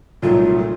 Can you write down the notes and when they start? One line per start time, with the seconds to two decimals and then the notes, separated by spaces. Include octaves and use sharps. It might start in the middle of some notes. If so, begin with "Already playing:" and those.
0.23 C2 A#2 F#3 A3 D#4 F4